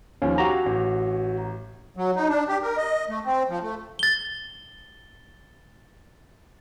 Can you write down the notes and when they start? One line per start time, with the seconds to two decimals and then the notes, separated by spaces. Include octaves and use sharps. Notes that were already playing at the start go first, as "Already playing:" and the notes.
0.22 D#2 F3 C#4
0.38 F#4 G4 F5 G#5 A#5
0.66 A1
1.97 F#3
2.16 D#4
2.28 D4
2.48 G4
2.63 A#4
2.77 D#5
3.09 A3
3.25 C4
3.49 F3
3.62 A3
3.99 A6 G7